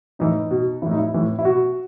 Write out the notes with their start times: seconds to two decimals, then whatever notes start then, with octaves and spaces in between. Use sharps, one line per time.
0.19 A2 E3 D#4
0.51 B2
0.82 A2 E3 E4
0.91 D#4
0.98 E4
1.14 A2 E3
1.39 E4
1.44 B2 F#4